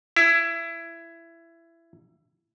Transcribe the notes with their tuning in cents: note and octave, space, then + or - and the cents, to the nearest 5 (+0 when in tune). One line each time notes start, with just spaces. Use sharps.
E4 +20